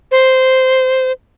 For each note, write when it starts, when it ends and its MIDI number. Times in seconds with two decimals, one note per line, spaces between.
0.11 1.12 72